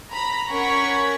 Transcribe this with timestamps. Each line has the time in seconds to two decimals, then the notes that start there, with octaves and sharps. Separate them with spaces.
0.11 A#5 B5
0.49 C#4 A#4 F#5 C#6 G#6 B6